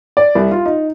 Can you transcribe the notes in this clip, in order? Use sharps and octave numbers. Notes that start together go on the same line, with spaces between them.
D5
C2
F4
D#4